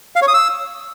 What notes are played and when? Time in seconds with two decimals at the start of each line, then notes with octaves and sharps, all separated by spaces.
0.16 F5
0.22 C#5
0.28 D#6
0.34 E6